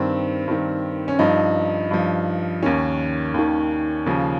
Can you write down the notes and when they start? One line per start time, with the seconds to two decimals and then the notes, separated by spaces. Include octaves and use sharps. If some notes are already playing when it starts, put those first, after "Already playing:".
Already playing: G2 D#3 C4
0.48 G2 D#3
1.08 C#4
1.19 G2 F3 D#4
1.91 G2 F3
2.63 D#2 D#3 C#4
3.34 D#2 D#3
4.06 D#2 C#3 F3